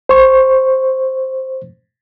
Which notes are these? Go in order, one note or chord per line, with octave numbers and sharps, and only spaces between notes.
C5 C#6